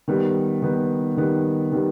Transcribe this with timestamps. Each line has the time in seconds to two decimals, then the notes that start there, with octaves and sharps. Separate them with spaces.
0.08 D#3 G3 B3
0.62 D#3 G3 B3
1.17 D#3 G3 B3
1.72 D#3 G3 B3